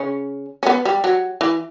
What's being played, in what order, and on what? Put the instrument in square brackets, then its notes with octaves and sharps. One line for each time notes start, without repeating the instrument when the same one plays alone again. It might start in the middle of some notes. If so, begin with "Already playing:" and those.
Already playing: [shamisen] C#3 C#4
C#4
B3
G3
F#3
E3